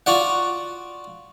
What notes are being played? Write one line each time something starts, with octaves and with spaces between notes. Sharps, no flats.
F4 F#4 D5 F#5